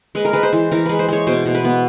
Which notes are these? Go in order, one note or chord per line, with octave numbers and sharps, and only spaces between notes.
G#3 B4
A#4
G#3 B4
C5
E3
E3 A#4
G#3 B4
C5
G#3 C#5
B2 C5
B2
B4
B3